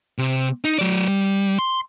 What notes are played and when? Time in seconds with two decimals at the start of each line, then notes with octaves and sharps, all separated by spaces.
0.18 C3
0.64 D#4
0.78 F#3 D5
1.08 G3
1.59 C6